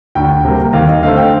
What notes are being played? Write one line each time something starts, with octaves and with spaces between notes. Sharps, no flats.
D2 G5
C3 G3 A#3
D#2 F5
D#5
D3 A3 C4 F5
G5